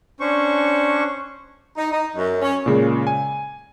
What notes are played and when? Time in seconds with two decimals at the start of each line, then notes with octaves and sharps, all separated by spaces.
0.20 C#4 D4 C5 C#6
1.77 D#4
1.91 D#4
2.14 F#2
2.42 C#4
2.66 A#2 C#3 G#3
3.07 G#5